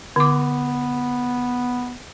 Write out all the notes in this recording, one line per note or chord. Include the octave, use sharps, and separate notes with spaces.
D3 B3 D6